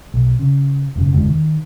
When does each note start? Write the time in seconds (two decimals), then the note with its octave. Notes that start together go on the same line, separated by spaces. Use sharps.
0.14 B1
0.39 C#3
0.96 E1 F#2 C#3
1.12 F#1 E2 D3 G#3
1.28 D#3